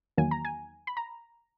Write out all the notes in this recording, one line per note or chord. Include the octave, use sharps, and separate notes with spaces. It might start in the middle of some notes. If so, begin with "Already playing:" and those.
E2 D#3 F#3 A#3 G#5
A#5
G#5
B5
A#5